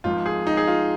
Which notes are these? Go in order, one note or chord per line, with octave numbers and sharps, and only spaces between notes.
G#1 G#2 F3 F4
G#4
D#4
G#4
F4